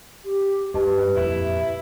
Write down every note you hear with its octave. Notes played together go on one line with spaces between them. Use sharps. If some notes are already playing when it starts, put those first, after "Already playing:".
G4
G2 G4 B4 D#5 A5
F2 A#2 E4